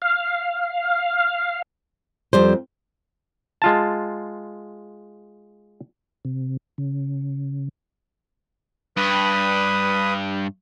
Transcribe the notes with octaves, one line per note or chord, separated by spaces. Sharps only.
F5
F2 G3 C5
G#3 F4 A5
C3
C#3
G2 B4 D#6